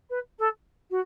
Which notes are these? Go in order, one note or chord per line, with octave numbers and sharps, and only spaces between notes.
B4
A4
F#4